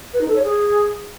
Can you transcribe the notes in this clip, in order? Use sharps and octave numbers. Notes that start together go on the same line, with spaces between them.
B4
D#4
A4
C#5
G#4